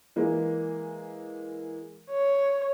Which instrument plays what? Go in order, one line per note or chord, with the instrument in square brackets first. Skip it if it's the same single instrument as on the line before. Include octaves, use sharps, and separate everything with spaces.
[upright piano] E3 G#3 A#3
[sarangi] C#5